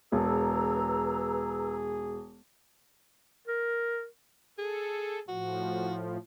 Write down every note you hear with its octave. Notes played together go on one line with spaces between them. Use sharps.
E1 G#4 B4 A#5 E6
A#4
G#4 A4
A2 F3 F#4